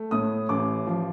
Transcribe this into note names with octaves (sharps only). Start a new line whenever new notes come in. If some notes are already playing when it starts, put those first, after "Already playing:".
Already playing: A3
A2 D#6
A1 D6
F3